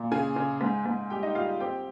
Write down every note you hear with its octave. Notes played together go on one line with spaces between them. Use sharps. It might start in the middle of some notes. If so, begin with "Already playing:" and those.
Already playing: A#2
C#3 G#4 G#5
C#3
G#2
G#2
G3 G4 G5
D#4 D#5
G3 F4 F5
C4 G4 G5